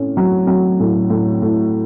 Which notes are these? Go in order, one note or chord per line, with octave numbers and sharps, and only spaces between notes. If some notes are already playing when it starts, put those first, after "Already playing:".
Already playing: A2 C#4
F#3
F#3
A2
A2
A2